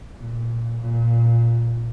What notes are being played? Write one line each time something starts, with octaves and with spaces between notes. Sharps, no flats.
A#2
A#2